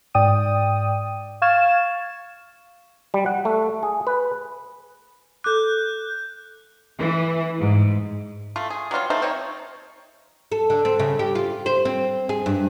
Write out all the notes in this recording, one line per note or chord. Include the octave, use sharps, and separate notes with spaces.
G#2 D5 G5 D#6 D#7
F5 C#6 F6 G#6 A6 E7
G3
F#5
A3
G#4
B4
A4 D6 F#6 G6
E3
G#2
A3 F4
G#4
F#3 G3 F4 C#5
A3 D#4 C5 E5
C4 D#4 C5 C#5
A4
D3
C4
C#3
G4
F4
C5
C4
G#4
G2